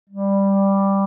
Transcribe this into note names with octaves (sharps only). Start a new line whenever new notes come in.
G3